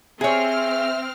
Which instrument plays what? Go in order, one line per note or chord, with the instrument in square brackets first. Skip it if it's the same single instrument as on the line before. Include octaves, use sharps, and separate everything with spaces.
[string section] C4 F6 [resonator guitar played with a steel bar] G#4 C#5 [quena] E5